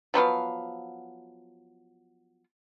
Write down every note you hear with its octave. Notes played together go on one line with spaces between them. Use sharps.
F3 F#3 B3 F5